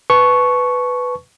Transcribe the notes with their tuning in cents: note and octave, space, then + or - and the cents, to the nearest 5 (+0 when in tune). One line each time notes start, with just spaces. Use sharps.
B4 +10 A5 -25 C#6 +0